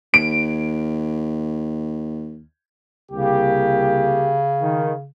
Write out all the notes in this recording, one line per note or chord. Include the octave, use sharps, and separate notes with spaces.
D#2 D7
C2 C#3 A#3 G4
D#3